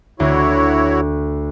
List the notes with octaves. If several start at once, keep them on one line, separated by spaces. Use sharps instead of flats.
D2 E4 F#4 C#5